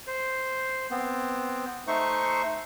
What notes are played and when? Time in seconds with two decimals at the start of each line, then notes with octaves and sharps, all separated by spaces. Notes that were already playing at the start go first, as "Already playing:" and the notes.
0.07 C5
0.91 B3 C4
1.88 A3 D#4 C5 C#6